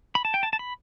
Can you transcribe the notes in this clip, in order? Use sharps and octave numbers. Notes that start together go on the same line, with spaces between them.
B5
A5
G5
A5
A5
B5